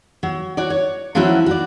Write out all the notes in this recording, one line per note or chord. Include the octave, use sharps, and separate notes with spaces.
F#3
F#4 C#5 D5
C#5
F3 F#3 A#3 C#4 E4 F#4
F#4 D5